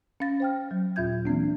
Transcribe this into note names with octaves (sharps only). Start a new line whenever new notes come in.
C#4 F5 A6 A#6
C5 G5 F6
F#3
D#2 A#2 F4 E5 G6 G#6
E3 A#3 C4 D4